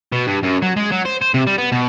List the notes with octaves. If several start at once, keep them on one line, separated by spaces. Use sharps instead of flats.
B2
G2
F#2
F#3
G#3
F#3
C5
C5
C3
G3
B3
B2